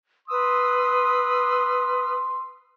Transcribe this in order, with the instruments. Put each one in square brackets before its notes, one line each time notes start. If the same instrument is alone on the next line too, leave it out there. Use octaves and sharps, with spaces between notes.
[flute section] B4 D#6 E6 [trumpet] C6